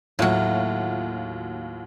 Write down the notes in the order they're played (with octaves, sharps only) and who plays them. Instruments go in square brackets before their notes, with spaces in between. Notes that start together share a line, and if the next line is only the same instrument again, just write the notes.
[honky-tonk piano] D#2 F4 F#4 [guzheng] A2 F#3